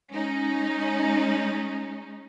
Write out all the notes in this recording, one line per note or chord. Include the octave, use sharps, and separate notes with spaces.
G#3 C#4 D#4